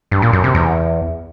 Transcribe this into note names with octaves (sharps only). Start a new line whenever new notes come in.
G2
A#2
F#2
C3
E2